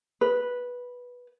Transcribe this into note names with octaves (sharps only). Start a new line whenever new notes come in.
B4